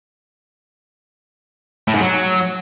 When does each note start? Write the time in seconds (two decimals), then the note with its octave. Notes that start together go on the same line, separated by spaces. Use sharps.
1.88 A2
1.94 G#2
2.01 F#3